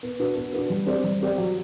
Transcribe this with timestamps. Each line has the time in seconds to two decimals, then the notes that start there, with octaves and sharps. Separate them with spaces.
0.03 B3
0.20 D4 F#4 B4
0.36 B3
0.53 D4 F#4 B4
0.70 G3
0.87 C4 G4 D5
1.04 G3
1.21 C4 G4 D5
1.38 F#3